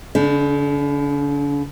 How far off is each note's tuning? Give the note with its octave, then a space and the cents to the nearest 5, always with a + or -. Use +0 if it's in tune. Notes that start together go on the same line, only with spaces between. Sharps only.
D3 -45 D4 +15